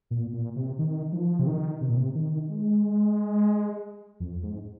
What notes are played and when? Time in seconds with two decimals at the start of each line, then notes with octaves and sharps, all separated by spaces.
0.11 A#2
0.33 A#2
0.56 C3
0.79 D#3
1.13 F3
1.39 C3
1.47 D#3
1.81 C3
1.89 A#2
1.96 C3
2.15 D#3
2.49 G#3
4.20 F2
4.43 G#2